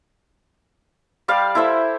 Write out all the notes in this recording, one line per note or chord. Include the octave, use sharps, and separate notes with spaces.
G3 G4 D5 F5
E4 A4 C5 E5